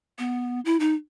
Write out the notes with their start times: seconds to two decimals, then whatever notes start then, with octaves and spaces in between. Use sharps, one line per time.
0.19 B3
0.65 E4
0.80 D#4